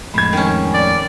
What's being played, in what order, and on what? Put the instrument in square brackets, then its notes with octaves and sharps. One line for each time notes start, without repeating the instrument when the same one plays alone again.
[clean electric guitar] F2 A2 G#3 [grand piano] B5 G#6
[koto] D#3 C#4
[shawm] D5